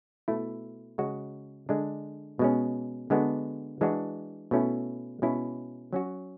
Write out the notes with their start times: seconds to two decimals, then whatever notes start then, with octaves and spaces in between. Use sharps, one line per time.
0.28 B2 A3 E4
0.98 C#3 G#3 C#4 F#4
1.69 D3 G#3 D4
2.39 B2 G#3 C#4
3.10 D3 G#3 B3 D4 F#4
3.81 E3 G#3 D4 F#4
4.51 B2 A3 C#4 E4
5.22 B2 G#3 C#4 E4
5.93 F#3 C#4 F#4